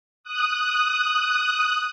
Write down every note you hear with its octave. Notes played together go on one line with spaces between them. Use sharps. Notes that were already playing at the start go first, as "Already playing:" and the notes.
D#6 F#6